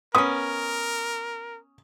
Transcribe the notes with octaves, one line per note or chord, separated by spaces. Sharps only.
B3 C#4 A#4 D#6